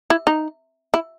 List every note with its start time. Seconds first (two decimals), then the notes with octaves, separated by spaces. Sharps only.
0.10 E4
0.27 D#4
0.94 E4